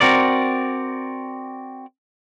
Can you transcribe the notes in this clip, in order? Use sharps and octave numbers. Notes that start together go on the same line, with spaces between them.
C4 F#4 A#4 D5